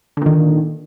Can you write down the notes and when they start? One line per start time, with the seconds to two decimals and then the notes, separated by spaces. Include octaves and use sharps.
0.17 D3
0.22 A#2
0.26 D#3